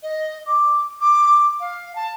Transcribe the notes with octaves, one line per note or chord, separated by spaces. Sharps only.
D#5
D6
D6
F5
A5